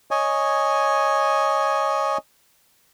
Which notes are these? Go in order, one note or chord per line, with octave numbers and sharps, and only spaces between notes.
C#5 D#5 G#5